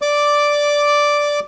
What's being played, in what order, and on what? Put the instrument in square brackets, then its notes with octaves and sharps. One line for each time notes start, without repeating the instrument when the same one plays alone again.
[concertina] D5 D6